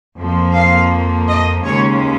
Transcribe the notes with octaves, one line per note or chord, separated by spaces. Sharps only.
F2 F3 A#3
F5
D#5
D#2 C#3 G#3 C#4 C#5